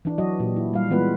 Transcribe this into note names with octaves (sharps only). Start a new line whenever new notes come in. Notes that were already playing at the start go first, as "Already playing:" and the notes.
E3 D4
F#3 F#4 D#5
A#2 G4
E4
G3 F5
E3 G#3 B3 F4 B4